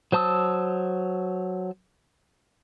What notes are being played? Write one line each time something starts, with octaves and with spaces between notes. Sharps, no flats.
F#3 C5 A5 D#6 E6